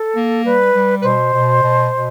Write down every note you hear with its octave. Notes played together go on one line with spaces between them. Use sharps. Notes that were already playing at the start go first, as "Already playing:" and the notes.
Already playing: A4
A#3
G3 B4
G3
B4
B2 C5
B2
B2
B2